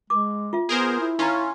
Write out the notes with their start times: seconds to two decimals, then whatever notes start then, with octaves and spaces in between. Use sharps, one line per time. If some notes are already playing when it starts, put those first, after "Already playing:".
0.10 G#3 D6
0.53 F4 E5
0.69 B3 G#4 A#4 C5
1.00 E4
1.19 C#4 D#4 F4 A#5